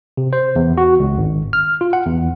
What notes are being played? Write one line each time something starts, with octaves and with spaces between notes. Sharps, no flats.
C3
C5
E2
F#4
C#2
G#1
F6
F4
F#5
E2